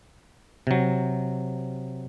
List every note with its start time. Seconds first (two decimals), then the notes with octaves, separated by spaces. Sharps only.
0.67 C3 F#3